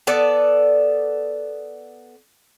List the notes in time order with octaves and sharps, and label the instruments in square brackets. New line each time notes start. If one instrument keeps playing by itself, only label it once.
[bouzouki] B3 A4 D5